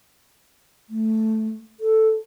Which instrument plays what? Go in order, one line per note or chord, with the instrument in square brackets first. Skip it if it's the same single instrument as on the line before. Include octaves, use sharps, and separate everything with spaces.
[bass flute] A3
A4